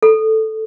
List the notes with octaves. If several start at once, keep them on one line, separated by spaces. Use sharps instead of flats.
A4